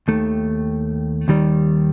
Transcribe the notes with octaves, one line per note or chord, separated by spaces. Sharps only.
D#2 D#3 A3
D#2 D#3 G3